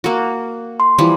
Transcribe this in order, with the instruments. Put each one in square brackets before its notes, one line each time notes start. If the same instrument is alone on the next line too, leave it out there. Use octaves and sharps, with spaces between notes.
[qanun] A#3 F#4
[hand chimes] C6
[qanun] E3 F3 G3